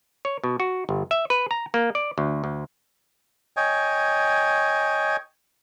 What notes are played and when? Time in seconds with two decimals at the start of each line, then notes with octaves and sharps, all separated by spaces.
0.25 C#5
0.44 B2
0.60 F#4
0.89 G1
1.11 E5
1.30 B4
1.51 A#5
1.74 A#3
1.95 D5
2.18 D2
2.44 D2
3.57 C#5 D#5 G5 G#5